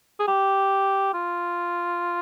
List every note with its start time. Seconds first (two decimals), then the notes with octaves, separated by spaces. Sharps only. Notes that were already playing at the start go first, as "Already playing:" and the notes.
0.19 G#4
0.28 G4
1.14 F4